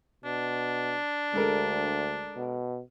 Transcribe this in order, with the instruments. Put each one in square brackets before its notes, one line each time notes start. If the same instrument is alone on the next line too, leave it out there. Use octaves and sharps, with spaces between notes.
[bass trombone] B2 [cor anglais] D4
[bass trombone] D2 [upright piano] G#3 A4 A#4
[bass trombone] B2